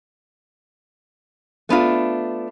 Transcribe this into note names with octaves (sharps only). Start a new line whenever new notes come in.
A3 B3 D4 F4